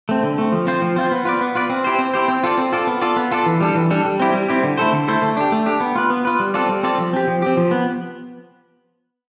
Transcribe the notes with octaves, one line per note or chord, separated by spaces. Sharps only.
A3 C4
D3
A3 C4
F3
C4 F4 C5
F3
C4 F4 C5
B3
F4 B4 D5
B3
F4 B4 D5
C4
E4 G4 C5
C4
E4 G4 C5
C4
F4 A4 D5
C4
F4 A4 D5
B3
F4 A4 D5
B3
F4 A4 D5
E3
G3 D4 A4
E3
G3 D4 A4
G3
C4 E4 G4
G3
C4 E4 G4
D3
A3 E4 A4 C5
D3
A3 E4 A4 C5
A3
D4 G4
A3
D4 G4
B3
F4 B4
B3
F4 B4
G3
C4 F4 A4 D5
G3
C4 F4 A4 D5
F3
C4 G4
F3
C4 G4
F3
B3